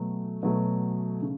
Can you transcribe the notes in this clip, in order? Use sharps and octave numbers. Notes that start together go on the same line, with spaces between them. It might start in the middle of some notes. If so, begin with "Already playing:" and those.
Already playing: B2 F#3 A3
B2 F#3 A3
C#3